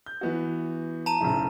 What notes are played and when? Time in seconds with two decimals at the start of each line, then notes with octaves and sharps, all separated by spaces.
0.06 G6
0.21 E3 B3 F#4
1.06 A5 A#5 D#7
1.20 F#1 B1 A2